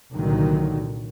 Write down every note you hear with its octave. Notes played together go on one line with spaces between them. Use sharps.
C2 A#2 D3 D#3 F#3